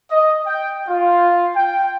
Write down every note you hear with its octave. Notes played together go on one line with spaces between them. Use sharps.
D#5
G5
F4
G5